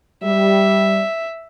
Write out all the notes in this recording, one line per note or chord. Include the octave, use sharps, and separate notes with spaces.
G3 E5